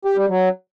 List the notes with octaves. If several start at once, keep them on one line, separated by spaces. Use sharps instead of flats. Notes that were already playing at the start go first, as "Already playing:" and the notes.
G4
G3
F#3